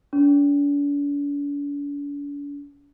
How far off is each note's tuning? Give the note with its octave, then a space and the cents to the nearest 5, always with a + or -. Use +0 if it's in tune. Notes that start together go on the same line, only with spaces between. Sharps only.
D4 -45